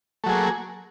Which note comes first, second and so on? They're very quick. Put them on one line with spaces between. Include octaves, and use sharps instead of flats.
A3 F#3 G#4 A#3